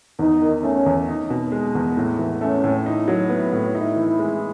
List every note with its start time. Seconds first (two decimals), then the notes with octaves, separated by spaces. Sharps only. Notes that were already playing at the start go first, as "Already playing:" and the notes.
0.19 E2 D#4
0.42 D#3
0.63 A3 C#4
0.86 E2
1.08 D#4
1.30 B2
1.52 G#3
1.75 E2
1.97 A2
2.19 E3
2.41 A3 C#4
2.64 A2
2.85 D#4 E4
3.08 F#3
3.29 B3
3.53 A2
3.74 D#4 E4
3.96 E3
4.19 G#3